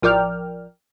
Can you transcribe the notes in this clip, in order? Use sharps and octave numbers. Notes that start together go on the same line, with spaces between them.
A1 F3 A#4 D5 G5 F6